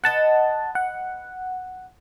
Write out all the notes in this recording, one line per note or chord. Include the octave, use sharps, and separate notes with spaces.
B4 D#5 F#5 A5
F#5